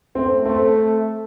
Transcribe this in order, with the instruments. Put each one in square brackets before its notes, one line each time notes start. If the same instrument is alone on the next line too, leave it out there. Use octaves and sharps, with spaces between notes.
[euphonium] A3 [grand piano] C4
[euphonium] A3 [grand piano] C4